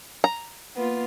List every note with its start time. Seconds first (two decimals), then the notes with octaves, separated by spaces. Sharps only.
0.24 A#5
0.74 A#3 B3 F4